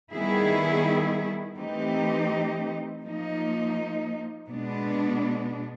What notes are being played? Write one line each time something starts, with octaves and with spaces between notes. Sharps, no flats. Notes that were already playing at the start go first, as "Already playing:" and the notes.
D#3 G3 B3 E4 G#4
E3 A3 C4 D#4 G4
F3 A#3 D#4
B2 G#3 B3 D4